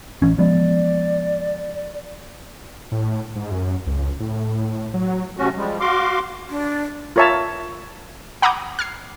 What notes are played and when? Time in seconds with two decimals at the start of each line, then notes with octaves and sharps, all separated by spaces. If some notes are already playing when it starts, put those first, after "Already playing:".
0.22 A1 E3 C#4
0.38 F3 G#3 B3 D5
2.92 A2
3.36 G#2
3.51 F#2
3.87 C#2
4.20 A2
4.94 F#3
5.37 C3 A3 C#4 F#4
5.57 F3 G3 G#3
5.80 F#4 F5 C6 D6
6.50 D4
7.16 F4 A#4 C#5 E5 A5
8.42 F#5 A#5 B5 D6 D#6 G6
8.79 F6 G#6 C7